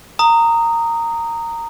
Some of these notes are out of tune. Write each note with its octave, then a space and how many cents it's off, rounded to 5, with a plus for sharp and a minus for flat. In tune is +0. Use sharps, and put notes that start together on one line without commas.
A#5 -15 D#6 +0